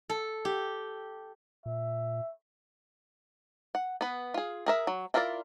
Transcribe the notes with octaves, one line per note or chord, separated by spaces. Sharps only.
A4
G4
A#2 E5
F#5
B3 B4
F4 G#4
G#4 A#4 E5
F#3
E4 F4 A#4 C5 D5